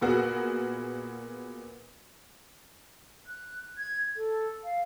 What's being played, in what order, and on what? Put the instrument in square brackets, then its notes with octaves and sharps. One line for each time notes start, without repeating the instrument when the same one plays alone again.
[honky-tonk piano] A#2 B3 F#4 G#4 A#4
[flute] F#6
G#6
A4
F5